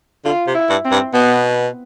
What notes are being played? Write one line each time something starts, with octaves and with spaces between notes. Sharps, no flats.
D3 F4
C3
E4
G2
C4
G2
B2 B3